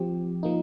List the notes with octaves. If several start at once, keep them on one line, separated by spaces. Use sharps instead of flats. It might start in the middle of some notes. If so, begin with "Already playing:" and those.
Already playing: F3 C4 G4
F3 A#3 D#4